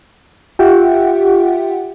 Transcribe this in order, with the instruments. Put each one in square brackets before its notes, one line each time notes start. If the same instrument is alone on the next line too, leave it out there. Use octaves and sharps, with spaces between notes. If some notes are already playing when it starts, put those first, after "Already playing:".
[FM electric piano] F4 G4 E5 F#5 G5